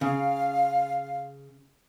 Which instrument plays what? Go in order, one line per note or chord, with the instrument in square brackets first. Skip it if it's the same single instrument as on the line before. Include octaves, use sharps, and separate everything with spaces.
[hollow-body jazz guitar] C#3 [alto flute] F5